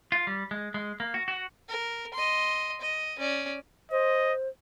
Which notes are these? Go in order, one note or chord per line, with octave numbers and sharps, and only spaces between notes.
F4
G3
G#3
G#3
A#3
F#4
F#4
A#4
D#5 C6
D#5
C#4 D5
C5 D#5